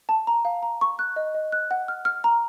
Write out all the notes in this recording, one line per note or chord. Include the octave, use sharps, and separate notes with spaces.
A5
A#5
F5
A#5
C#6
F#6
D#5
D#5
F#6
F#5
F6
F6
A#5